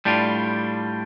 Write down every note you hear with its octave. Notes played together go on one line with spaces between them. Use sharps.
A2 G3 D4 F4